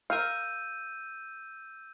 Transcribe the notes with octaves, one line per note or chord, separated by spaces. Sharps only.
A#4 F5 E6 G6 D#7